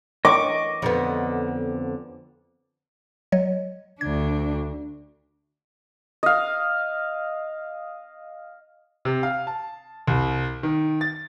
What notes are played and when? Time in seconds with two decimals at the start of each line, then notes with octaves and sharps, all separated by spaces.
0.25 D#5 C#6 D6
0.82 F2 D3 B3
3.32 F#3 C#5 D#5
4.01 D2 D4 G#6
6.23 D#5 F5
9.05 C3
9.23 F5
9.47 A5
10.08 C2
10.63 D#3
11.01 A6